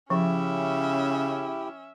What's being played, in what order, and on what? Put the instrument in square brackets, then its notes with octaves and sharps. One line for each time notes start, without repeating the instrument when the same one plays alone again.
[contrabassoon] C#3 [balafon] F3 [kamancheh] C#4 E5 [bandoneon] E4 G4